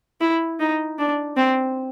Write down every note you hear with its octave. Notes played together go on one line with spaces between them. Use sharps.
E4
D#4
D4
C4